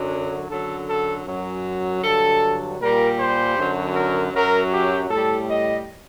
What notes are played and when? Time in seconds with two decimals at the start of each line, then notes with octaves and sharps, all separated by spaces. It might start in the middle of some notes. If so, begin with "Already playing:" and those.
Already playing: F#2 D3 F#3
0.48 F#2 D3 F#3 A4
0.87 A4
1.26 F#2 F#3
2.02 G2 D3 F#3 A4
2.79 A#2 G3 A#4
3.17 C5
3.56 F#2 D3 F#3
3.94 A#4
4.32 F#2 F#3 A#4
4.71 G4
5.09 A2 G3 A4
5.48 D#5